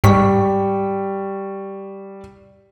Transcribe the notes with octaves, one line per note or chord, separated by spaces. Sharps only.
G#2 G3 C#6 B6